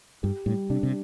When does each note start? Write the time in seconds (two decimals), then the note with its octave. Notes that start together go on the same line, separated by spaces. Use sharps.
0.23 G2 G4
0.46 A2 G3
0.69 C3 D4
0.83 C3